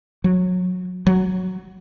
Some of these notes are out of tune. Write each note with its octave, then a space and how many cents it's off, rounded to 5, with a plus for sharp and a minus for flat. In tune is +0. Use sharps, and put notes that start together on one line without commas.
F#3 -20
F#3 +0